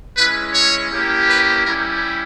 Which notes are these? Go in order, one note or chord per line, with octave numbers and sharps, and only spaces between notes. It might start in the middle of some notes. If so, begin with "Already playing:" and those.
G#3 C#4 E4 B4
C#5
A#3 C#4 E4 G4
B4
G3 C#4 E4 G4 A#4